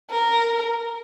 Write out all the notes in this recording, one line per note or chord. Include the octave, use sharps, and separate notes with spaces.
A#4